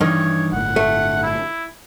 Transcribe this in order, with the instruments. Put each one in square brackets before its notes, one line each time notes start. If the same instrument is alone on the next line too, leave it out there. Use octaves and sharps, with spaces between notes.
[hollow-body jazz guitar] G2 D#3 [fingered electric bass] E3 [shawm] C#5
[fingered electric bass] G1 A2 [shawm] F#5
[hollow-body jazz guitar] A3
[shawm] E4